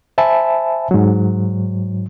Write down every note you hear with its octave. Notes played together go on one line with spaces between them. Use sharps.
C5 E5 G#5 A5 B5
G#2 F#3